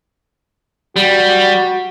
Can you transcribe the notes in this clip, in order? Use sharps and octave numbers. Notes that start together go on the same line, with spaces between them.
G3 F#4